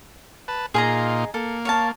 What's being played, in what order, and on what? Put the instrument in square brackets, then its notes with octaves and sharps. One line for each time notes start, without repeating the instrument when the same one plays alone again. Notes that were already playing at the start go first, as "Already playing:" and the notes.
[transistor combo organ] B4 A5
[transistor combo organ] A#2 D#4 F4 [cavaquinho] G#4 D#5 A#5
[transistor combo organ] A#3 [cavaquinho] A4
[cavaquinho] C#5 F5 A5